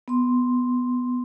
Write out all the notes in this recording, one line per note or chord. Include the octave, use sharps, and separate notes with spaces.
B3 C6